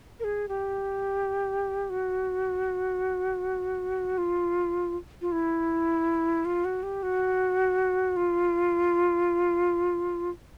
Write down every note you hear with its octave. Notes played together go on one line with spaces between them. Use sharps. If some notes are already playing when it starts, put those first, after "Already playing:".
A#4
G#4
G4
F#4
F4
F4
E4
F4
F#4
G4
F#4
F4